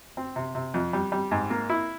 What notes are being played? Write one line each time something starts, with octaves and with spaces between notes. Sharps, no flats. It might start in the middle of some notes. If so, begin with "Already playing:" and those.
C4
C3
C3
F2
G3
G3
G#2
A#3
E4